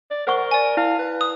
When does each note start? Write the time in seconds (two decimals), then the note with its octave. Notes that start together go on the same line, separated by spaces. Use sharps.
0.11 D5
0.27 A#4 C5 F#5 C#6
0.51 D5 G#5
0.77 E4 F5
0.99 B4
1.21 D#6